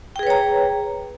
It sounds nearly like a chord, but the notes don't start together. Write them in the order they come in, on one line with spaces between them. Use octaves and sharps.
G5 G#4 B4 C#5 A#5